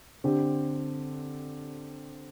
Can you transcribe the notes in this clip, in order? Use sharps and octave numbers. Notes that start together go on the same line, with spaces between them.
D3 C4 G4